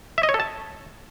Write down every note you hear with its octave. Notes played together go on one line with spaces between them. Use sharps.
E5
D#5
C#5
A4
A5